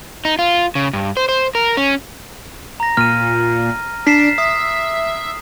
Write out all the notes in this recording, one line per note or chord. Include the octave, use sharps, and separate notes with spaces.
D#4
F4
C#3
G2
C5
C5
A#4
C#4
A#5 A#6
A#2 F6 D#7
D4 B6 C7 E7
E5 D#6